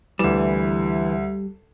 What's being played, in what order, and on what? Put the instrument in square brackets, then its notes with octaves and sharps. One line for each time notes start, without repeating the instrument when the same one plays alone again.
[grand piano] D2 E7 [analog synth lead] E3 [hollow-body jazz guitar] G3